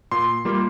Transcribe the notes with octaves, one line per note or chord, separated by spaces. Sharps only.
A#2 C6
G3 A#3 F4